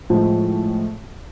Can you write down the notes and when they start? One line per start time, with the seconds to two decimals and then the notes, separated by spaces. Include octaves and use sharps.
0.10 A2 F3 G#3